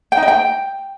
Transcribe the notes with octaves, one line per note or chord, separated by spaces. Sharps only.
G5
D#4
D#5
G5